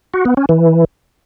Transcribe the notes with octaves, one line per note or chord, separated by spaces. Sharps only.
F#4
B3
C#4
E3